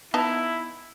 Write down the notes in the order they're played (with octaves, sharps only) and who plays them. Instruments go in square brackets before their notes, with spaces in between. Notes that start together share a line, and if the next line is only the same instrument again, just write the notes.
[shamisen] B3 D#4 A5 [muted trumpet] E4